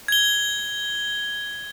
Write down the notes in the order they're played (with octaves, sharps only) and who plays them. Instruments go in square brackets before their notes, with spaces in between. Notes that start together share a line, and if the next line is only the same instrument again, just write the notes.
[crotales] G#6 G7